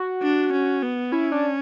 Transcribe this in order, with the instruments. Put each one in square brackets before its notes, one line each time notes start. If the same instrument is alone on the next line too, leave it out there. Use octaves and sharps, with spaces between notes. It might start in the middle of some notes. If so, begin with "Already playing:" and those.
Already playing: [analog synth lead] F#4
[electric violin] D4
C#4
B3
[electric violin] C#4 [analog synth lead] E4
[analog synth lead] D4